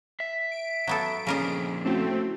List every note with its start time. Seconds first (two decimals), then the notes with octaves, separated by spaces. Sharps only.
0.20 E5
0.51 D7
0.87 F#3 B3 A4
1.27 F2 A#2 C#3 A#4 D#5
1.85 A3 C4 C#4 E4 F#4